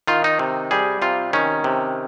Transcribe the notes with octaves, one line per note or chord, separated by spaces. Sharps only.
D#3 F4
D#4
C3
G3 G#4
C3 F4
D#3 C#4
C3